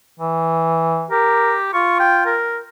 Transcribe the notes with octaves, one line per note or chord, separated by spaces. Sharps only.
E3
G4 A#4
F4 C#6
G5
A#4